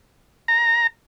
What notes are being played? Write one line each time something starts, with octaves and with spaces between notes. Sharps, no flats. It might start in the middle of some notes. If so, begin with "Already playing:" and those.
A#5